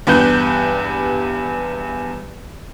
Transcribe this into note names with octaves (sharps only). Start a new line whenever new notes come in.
E2 G2 B3 G4 F#6 G6